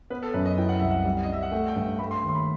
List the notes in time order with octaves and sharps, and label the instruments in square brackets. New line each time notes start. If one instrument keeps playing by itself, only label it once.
[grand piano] B3 [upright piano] B4
[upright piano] A4
[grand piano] F#2 [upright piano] B4
[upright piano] D#5
[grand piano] E4 [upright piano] G5
[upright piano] F#5
[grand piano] C2 [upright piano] E5
[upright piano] F#5
[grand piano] G3
[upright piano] D#5
[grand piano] G3 [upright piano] E5
[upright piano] F#5
[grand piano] A3 [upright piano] G5
[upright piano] G5
[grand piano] G2
[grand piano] A3 [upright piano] B5
[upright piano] C6
[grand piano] D#2
[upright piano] C6
B5